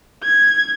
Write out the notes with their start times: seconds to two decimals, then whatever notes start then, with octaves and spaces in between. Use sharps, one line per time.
0.23 G#6